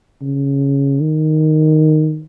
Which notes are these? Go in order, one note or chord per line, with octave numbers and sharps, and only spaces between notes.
C#3
D#3